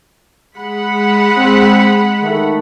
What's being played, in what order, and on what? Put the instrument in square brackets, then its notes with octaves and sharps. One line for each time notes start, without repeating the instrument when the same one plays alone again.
[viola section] G#3 F#5 B5
[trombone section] C4
D#3 A3